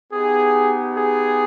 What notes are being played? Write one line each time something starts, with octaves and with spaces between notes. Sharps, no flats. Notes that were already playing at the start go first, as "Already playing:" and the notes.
B3 D#4 G4 G#4
G#4